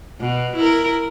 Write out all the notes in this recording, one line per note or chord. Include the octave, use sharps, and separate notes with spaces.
B2
E4 A#4